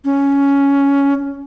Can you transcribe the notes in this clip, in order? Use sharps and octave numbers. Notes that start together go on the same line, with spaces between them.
C#4